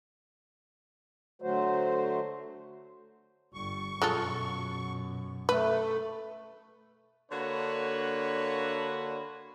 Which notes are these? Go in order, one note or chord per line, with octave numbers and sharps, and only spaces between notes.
D3 F#3 A3 F#4 C5
G1 G3 C#6
F#2 B2 G#3 F4 A4
A3 B4
D3 A#3 D4 F#4 B4 C#5